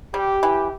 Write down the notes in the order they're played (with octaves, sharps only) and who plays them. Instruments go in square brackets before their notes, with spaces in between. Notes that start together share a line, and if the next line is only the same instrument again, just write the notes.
[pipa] G3 [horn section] G4
[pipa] E3